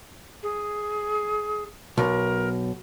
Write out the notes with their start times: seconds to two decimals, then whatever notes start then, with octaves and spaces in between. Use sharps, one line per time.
0.43 G#4
1.98 B1 A#4